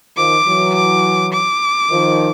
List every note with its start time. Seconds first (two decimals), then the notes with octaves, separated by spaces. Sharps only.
0.17 D#3 F3 D6
0.46 E3 F#3
0.75 D6
1.33 D6
1.90 D#3 F3